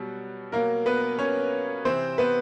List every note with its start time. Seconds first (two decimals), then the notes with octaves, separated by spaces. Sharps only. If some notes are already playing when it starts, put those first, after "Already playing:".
Already playing: B2 F#3 G3
0.52 B2 F#3 A#3 A#4
0.86 B3 B4
1.19 C#4 C#5
1.85 C3 E3 C4 C5
2.18 B3 B4